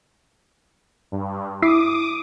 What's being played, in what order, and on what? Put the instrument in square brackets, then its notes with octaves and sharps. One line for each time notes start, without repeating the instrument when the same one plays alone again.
[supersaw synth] G2
[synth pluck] E4 C7 [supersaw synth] D6 D#6